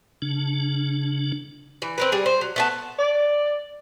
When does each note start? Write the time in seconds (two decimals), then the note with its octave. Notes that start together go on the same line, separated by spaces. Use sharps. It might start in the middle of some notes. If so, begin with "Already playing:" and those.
0.22 C#3 D4
1.82 E3
1.98 C4 A#4 B4
2.12 G3 G#4
2.26 C5
2.41 F#3
2.56 A3 B3 A5
2.97 D5